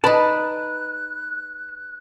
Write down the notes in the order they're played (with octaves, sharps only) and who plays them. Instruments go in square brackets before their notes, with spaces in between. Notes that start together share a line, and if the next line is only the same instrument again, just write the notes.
[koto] D#4 D5 [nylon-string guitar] B4 [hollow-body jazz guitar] A5 B5 [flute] F#6